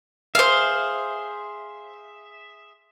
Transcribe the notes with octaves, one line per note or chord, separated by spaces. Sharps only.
G#4 C5 E5 F5